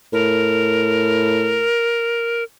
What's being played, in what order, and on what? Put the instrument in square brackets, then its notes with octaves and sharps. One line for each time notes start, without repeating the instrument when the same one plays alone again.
[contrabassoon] A2 [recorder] A#4